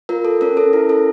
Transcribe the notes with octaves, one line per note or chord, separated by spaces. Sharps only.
F4 A#4
A4
C#4 A#4
C#4 A4
E4 A#4
C#4 A4